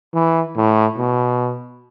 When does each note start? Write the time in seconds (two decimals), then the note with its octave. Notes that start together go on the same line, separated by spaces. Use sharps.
0.14 E3
0.57 A2
0.98 B2